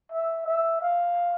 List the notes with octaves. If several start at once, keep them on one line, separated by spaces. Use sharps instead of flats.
E5
E5
F5